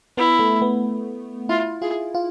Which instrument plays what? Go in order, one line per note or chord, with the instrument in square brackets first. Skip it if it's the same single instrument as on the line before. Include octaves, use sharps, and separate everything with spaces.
[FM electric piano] B3 [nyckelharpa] E4
[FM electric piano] A3
B3
[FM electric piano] E4 [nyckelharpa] F4
[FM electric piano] F4 [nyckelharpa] G#4
[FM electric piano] F4